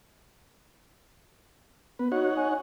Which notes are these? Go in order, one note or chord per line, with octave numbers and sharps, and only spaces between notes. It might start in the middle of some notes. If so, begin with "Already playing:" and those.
B3 B4
D#4 F#4 C#5 F#5
G#5